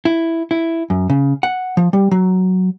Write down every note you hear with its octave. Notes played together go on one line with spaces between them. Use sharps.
E4
E4
F#2
C#3
F#5
F3
G3
F#3